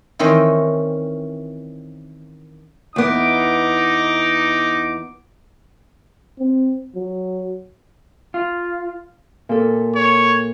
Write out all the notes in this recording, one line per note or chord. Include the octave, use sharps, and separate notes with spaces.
D#3 E3 C4 C#4 D#5
E2 B3 D#4 D6
C4
F#3
F4
A#2 A4
C#5